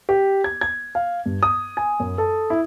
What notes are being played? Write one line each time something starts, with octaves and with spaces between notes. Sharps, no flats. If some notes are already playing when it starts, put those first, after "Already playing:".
G4
G#6
G#6
F5
G2
D#6
G#5
F#2
A4
E4